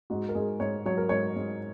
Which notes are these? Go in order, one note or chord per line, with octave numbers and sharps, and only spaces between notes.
G#2 F#4
A#4
G#2 G#4
G#2 C#5
F#3 C#5
A#4
G#2 C#5
G#2